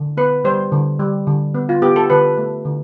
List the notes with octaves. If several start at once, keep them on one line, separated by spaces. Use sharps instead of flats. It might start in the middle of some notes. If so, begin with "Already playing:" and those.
Already playing: D3
B3 B4
G3 C5
D3
G3
D3
B3
F4
B3 G4
A4
D3 B4
A3
D3